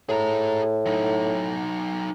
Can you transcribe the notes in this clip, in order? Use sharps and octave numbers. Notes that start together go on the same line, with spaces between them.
A2 G#4 A#5
F#3 D#4